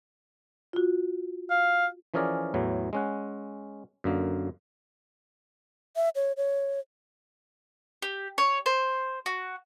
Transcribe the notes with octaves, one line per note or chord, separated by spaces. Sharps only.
F4 F#4
F5
E3 F3 C#4 G#4 A#4 D5
E2 A2 E3 F#3
G#3 C#4 F#5
F#2 D3 A#3
E5
C#5
C#5
G4
C#5
C5
F#4